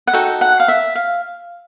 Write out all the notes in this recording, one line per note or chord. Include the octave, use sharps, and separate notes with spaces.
F#5
D#4 F#4 A4 G5
F#5
F5
E5
F5